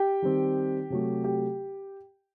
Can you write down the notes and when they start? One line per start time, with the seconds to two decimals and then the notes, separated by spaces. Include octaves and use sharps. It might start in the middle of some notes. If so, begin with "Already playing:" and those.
Already playing: G4 G5
0.22 D#3 G3 C4
0.90 C3 F#3 A3
1.24 G4 G5